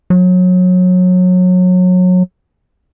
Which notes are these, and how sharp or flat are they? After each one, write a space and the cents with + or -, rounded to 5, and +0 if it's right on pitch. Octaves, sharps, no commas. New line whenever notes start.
F#3 -25